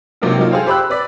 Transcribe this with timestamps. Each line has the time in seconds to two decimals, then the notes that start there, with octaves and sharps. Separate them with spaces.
0.22 G#2 C3 F#3 A#3 D4 F4
0.38 F#3 A#3 C#4 D#4 F4
0.51 G#4 A4 C5 F5 G5
0.66 G4 C5 B5 E6 F#6
0.78 E6
0.90 B4 D5 B6